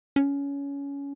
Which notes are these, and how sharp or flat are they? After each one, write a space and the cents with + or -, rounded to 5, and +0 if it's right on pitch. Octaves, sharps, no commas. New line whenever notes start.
C#4 +20